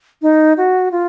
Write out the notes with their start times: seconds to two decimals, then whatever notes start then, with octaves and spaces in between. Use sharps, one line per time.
0.22 D#4
0.57 F#4
0.91 F4